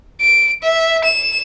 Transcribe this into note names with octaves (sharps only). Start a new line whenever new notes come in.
D7
E5
E7